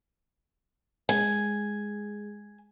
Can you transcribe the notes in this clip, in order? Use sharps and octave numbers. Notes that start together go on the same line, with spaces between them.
G#3 G#4 G#5